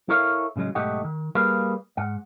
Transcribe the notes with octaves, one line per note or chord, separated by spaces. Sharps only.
E4 A4 A#4 C#5 E5 F5
A2 C#3 F3 F#3 G#3
B1 G#2 A3 D#4 G4 F#5
D#3
G3 A#3 G#4 B4 F5
G#2 F#5